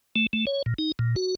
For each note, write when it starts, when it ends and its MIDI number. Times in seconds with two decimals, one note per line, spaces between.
0.16 0.27 57
0.33 0.45 57
0.47 0.62 73
0.66 0.74 46
0.78 0.92 63
0.99 1.15 46
1.16 1.35 66